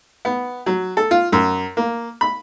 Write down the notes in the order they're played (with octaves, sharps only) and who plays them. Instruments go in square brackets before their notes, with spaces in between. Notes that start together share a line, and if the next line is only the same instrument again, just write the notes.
[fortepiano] B3
F#3
A4
F4
F#2
A#3
B5